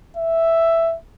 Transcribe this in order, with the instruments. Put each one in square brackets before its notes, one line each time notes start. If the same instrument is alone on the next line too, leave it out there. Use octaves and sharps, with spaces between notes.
[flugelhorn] E5